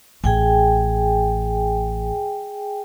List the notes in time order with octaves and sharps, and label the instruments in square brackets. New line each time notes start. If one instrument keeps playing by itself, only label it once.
[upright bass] A1 [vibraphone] G#4 G5 G#5